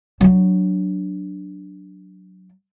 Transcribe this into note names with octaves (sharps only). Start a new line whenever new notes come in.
F#3 D4